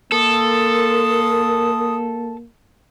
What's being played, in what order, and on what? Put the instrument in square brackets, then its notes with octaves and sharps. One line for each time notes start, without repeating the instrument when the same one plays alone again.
[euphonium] A#3 [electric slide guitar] A4 [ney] A#4 [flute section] C6 D#6